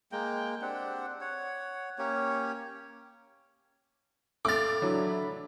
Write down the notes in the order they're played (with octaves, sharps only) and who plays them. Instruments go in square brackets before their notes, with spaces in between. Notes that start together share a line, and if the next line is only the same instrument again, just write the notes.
[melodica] G#3 A#3 G5
C4 D4 G4 F#5
C#5 F#5
A#3 C#4 G4 C#5
[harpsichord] A2 F5 [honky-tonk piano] D6 A6
[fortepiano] E3 F#3 [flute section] D4 E5 B5